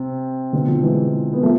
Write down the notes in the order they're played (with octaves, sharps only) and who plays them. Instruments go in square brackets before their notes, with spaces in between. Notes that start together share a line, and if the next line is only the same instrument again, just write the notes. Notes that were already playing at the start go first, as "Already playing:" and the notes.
Already playing: [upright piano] C3
B2 D3
D3 F3
E3 G#3
B3
F3 A3